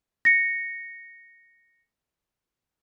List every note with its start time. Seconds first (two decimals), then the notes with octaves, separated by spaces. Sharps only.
0.25 A#6 C#7